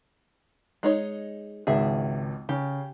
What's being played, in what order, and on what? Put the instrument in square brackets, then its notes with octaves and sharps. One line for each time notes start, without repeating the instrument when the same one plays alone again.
[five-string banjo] G#3 D#4 C#5
[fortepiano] G#1 C#2 [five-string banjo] G#4 E5
[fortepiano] C#3 [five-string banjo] G4